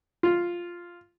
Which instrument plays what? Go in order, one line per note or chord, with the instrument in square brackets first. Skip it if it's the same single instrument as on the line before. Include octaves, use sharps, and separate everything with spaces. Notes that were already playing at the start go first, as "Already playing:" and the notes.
[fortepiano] F4